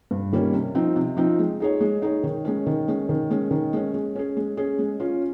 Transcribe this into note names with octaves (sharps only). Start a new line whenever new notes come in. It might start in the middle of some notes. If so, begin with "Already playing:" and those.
G2
D#3 G3 A#3 C#4
C3
F3 C4 D#4
C3
F3 C4 D#4
G#3
D#4 G#4 C#5
G#3
D#4 G#4 C#5
D#3
G#3 C#4
D#3
G#3 C#4
D#3
G#3 C#4
D#3
G#3 C#4
G#3
C#4 G#4
G#3
C#4 G#4
G#3
C#4 F4